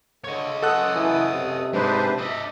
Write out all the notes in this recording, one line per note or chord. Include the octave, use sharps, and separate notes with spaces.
D3 C#5 D#5
F#2 A4 F#5 D#6 F#6
E3
C3
G#3 D4 D#4 B4 C5
D4 D#5 E5